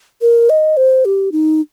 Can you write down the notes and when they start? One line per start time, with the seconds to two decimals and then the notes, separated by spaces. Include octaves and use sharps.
0.21 A#4
0.49 D#5
0.77 C5
1.05 G4
1.32 D#4